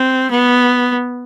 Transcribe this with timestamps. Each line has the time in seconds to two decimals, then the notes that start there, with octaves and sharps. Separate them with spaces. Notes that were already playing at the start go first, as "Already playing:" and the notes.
Already playing: C4
0.31 B3